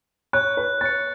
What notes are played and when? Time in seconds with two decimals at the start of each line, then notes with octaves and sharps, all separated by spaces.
0.33 C#5 F#6
0.57 B4
0.81 C#5 A6 C#7